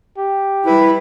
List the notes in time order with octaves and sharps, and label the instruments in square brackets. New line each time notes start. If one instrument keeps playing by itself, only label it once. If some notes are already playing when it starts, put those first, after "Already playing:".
[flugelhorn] G4
[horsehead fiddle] G3 B4 [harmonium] E4